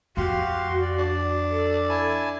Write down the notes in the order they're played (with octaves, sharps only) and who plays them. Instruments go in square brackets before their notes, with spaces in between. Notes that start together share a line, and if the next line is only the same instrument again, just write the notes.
[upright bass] F2 [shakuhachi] F#4 [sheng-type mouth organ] G4 F5 C6
[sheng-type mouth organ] D5
[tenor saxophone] D4
[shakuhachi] A4
[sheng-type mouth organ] E4 G#5 A5